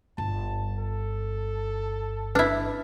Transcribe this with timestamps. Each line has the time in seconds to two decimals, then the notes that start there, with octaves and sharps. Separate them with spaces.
0.18 G1 A5
0.79 A4
2.35 D4 E4 B4